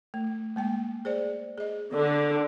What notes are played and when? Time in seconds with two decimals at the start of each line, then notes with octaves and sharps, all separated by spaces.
0.14 A3
0.56 G#3 A#3 G5
1.05 G#4 C5 D5
1.58 G#4 D#5
1.93 D3